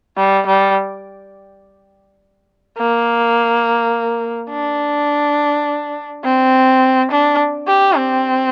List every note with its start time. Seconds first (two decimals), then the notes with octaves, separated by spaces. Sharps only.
0.17 G3
0.46 G3
2.77 A#3
4.50 D4
6.24 C4
7.11 D4
7.68 G4
7.96 C4